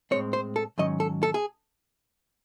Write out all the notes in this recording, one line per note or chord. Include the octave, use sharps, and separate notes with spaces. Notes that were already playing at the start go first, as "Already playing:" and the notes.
A2 G#3 C4 C#5
C5
A4
G#2 D#3 F#3 C#4 D#5
A4
A4
G#4